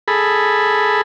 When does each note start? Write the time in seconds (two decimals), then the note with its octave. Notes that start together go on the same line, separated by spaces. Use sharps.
0.08 G#4 A4 B5